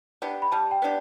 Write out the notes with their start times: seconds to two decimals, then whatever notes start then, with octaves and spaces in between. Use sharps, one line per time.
0.22 B3 D4 G4
0.42 B5
0.52 G3 A5
0.71 G5
0.82 B3 D4 G4